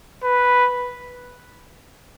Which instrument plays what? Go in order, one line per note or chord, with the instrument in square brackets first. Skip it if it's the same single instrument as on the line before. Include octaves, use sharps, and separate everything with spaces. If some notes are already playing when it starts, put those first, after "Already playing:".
[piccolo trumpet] B4